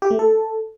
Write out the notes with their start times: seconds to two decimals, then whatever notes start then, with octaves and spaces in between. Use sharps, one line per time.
0.02 G4
0.11 A3
0.19 A4